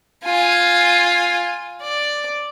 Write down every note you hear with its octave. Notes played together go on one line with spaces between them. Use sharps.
F4 G#5
D5